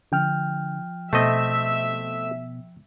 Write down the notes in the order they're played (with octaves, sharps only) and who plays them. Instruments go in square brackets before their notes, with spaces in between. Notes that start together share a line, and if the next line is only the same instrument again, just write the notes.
[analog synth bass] D3 [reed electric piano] F3 G5 F6
[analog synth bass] B2 [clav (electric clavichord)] A3 C4 D#5 [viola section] E5